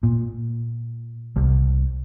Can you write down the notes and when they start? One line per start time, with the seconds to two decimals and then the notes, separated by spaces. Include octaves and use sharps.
0.03 A#2
1.36 C2